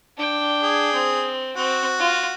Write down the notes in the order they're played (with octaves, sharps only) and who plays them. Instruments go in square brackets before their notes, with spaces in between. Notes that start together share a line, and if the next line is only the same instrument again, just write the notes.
[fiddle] D4 G5
[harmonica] G#4
[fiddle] C4
[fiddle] C4 [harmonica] F#4
[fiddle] F4